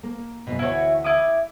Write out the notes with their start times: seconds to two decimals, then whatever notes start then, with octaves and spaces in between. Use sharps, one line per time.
0.03 A#3
0.47 F#2 B2
0.59 D2 E3 E4 F#4 C#5 F#5
1.04 E4 D6 D#6